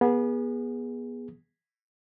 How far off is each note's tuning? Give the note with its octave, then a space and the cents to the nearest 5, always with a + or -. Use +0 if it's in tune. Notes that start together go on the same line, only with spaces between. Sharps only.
B3 -25 G#4 -10